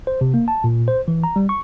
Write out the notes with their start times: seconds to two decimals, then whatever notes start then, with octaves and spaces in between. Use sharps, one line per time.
0.07 C5
0.21 C3
0.34 A#3
0.48 A5
0.64 A#2
0.88 C5
1.08 E3
1.24 A#5
1.36 G3
1.49 C#6